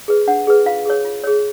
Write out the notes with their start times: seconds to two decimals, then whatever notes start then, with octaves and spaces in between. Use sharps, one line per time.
0.08 G#4 B4
0.27 D4 F#5
0.47 G#4 B4
0.66 F4 F5
0.86 G#4 C#5
1.05 F4
1.24 G#4 C#5